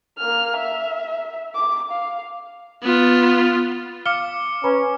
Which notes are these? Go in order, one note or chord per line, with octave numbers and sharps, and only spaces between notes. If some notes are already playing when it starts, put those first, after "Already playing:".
A#3 F6
E5
D6
F5
B3 F4
F5 D6 F6 C#7 G7
C#4 B4 A#5 B5